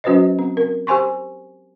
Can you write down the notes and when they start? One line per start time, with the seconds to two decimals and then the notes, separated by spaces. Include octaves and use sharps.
0.04 F#3 C#4 F#4 B4 C5 D#5
0.39 C4
0.57 A#4
0.87 G4 C5 G#5 C6 C#6